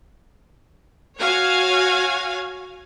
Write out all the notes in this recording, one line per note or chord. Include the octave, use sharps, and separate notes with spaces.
F#4 C#5 F5 G#5